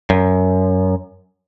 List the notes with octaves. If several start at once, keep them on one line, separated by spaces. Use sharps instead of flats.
F#2